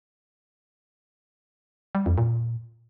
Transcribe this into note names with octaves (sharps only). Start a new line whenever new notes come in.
G3
F2
A#2